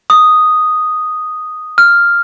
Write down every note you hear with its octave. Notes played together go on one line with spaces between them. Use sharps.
D#6
F6